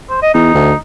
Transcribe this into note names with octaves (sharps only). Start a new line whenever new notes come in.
C5
D#5
E2 D#4
D2